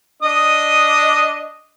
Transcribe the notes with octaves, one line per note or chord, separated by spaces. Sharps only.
D4 D#5 D#6